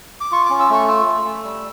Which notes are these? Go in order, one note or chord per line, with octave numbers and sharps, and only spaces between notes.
D6
F4 C#6
C#4 D6
E6
A3 C#6
F4 E6
A3
A3
G3